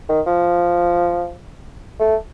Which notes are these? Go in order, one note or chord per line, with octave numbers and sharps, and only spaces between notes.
D#3
F3
A3